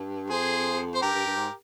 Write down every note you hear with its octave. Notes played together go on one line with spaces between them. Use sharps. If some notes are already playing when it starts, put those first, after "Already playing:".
Already playing: G2
F2 G#4 C5
C5
G2 G4 A#4
G2
G2
G#2